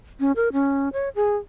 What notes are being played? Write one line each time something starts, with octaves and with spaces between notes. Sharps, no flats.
C#4
A#4
C#4
C#5
G#4